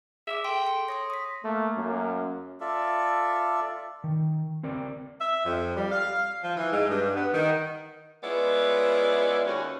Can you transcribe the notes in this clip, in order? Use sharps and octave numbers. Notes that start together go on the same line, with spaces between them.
G#4 E5 D6
A4 G5 C6
C6 C#7
C#5 C6 D#6 A#6
D#6 B6
A3 A#3
F#2
F4 A4 D5 E5
D#3
C4 A#4 D5
E5
F2
G3
F5
F3
E3
G#2
G2
B3
D#3
G#3 B3 C#4 E4 F4 D5
D#2 C#4 F#4